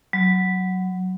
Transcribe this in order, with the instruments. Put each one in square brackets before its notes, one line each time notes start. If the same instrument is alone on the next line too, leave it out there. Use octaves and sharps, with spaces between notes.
[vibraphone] F#3